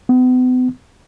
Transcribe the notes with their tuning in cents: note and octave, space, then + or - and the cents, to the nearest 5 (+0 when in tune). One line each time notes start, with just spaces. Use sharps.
B3 +40